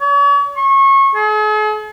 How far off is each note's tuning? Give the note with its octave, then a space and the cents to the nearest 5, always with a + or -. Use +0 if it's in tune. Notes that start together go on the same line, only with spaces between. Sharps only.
C#5 +40
C#6 -25
G#4 +45